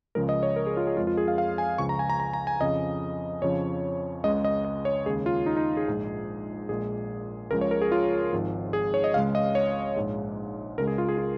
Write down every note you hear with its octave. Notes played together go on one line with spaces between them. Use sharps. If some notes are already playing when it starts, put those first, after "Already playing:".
C#2 C#3 F3 G#3 A#4
D#5
C#5
A#4
G#4
F4
G#4
F2 F3 G#3 F4
F4
G#4
F5
F5
G#5
C#2 C#3 F3 C#6
A#5
G#5
A#5
A#5
A#5
G#5
F2 C#3 F3 D#5
F2 C#3 F3 C#5
C#2 C#3 G#3 D#5
D#5
D#5
C#5
D#2 C#3 G#3 G#4
F4
D#4
D#4
G#4
A#1 G#2 G#3
A#1 A#2 G#3 G#4
C#2 C#3 F3 G#3 A#4
C#5
A#4
G#4
F4
G#1 G#2 F3
G#4
C#5
D#5
C#2 C#3 G#3 F5
D#5
C#5
A#1 G#2 G#3
C#2 C#3 G#3 A#4
G#4
F4
G#4
F4